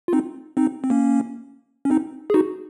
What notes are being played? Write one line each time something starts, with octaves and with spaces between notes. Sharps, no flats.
F4
C4 D#4
C4 D#4
C4
A#3 C#4
C#4
C4 D#4
G#4
D#4 F#4